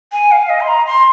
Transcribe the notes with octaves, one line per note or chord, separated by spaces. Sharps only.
G#5
F5
D#5
C6
A#5
C6